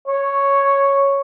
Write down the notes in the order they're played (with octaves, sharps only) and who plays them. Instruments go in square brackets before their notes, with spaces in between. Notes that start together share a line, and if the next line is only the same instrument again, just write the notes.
[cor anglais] C#5